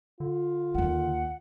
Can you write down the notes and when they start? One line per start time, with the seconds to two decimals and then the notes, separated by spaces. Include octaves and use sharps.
0.20 D3 F4
0.74 D#2 A#3 F#5